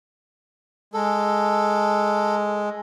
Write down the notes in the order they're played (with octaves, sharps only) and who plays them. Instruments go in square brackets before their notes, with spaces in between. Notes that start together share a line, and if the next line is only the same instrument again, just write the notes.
[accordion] G#3 [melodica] A4